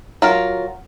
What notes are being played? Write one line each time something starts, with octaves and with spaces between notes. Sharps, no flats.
F#3 F4 A#4